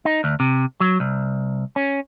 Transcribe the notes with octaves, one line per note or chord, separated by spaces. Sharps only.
D#4
D2
C3
F#3
C2
C#4